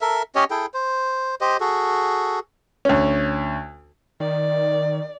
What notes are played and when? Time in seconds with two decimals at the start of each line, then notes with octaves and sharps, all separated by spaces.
0.01 A4 A#4 E5
0.35 C#4 G4 C#5 D#5
0.51 E4 G#4 A4 G5
0.74 C5
1.41 G4 C5 D#5
1.60 F#4 G#4 A4
2.85 D2 C#4
4.20 D#3 D5